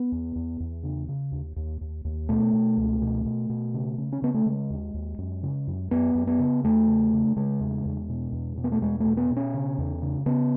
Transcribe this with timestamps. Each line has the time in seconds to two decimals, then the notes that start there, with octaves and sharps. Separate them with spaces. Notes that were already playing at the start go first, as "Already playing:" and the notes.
Already playing: B3
0.12 E2
0.35 E2
0.60 E2
0.83 C#3
1.08 C#3
1.32 D#2
1.56 D#2
1.81 D#2
2.05 D#2
2.29 B2 A3
2.53 B2
2.77 C#2
3.02 B2
3.25 B2
3.50 B2
3.74 C#3
3.98 C#3
4.13 C#4
4.22 C#3 B3
4.34 A3
4.46 C#3 G#3
4.70 D#2
4.94 D#2
5.18 F#2
5.43 C#3
5.68 F#2
5.91 F#2 B3
6.15 F#2
6.27 B3
6.39 C#3
6.64 E2 A3
6.88 C#3
7.13 C#3
7.37 C#3 G#3
7.61 E2
7.85 E2
8.09 B2
8.33 E2
8.57 B2
8.64 B3
8.72 A3
8.82 E2 G#3
9.00 A3
9.06 B2
9.17 B3
9.30 B2
9.37 C#4
9.54 C#3
9.78 E2
10.02 C#3
10.26 C#3 B3